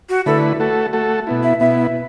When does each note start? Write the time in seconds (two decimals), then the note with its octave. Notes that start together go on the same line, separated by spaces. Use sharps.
0.09 F#4
0.26 D3 A3 E4 A4 B4
0.60 A3 F#4 A4
0.93 A3 F#4 A4
1.27 B2 B3 E4
1.43 E5
1.60 B2 B3 E4 E5